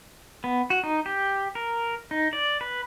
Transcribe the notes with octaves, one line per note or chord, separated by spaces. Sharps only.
B3
F#4
D#4
G4
A#4
D#4
D5
B4